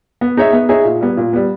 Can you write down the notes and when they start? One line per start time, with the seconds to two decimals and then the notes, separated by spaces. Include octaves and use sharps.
0.21 B3
0.37 D#4 G#4 C#5 E5
0.53 B3
0.69 D#4 G#4 C#5 E5
0.85 A#2
1.01 G3 B3
1.17 A#2
1.33 G3 B3